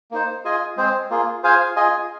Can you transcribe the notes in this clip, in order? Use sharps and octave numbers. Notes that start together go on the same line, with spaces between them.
A#3 D#4 C5
F4 G#4 D#5 G#5
G#3 C4 G#4 C5
A#3 F4 G#4
F4 G#4 C5 F5 G#5
F4 G#4 D#5 G#5